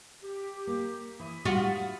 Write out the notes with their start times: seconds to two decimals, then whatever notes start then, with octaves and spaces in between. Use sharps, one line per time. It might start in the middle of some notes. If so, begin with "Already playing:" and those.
0.23 G4
0.67 A#3
1.20 E3 E5 B5 D#6
1.45 G3 D#4 F4 F#4
1.78 F#5